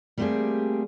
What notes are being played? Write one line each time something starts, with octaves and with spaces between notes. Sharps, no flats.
G3 A3 A#3 C4 G4 G#4